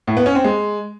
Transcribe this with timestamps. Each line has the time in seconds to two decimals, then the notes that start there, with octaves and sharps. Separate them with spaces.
0.07 A2
0.17 B3
0.26 C#4
0.35 C4
0.44 G#3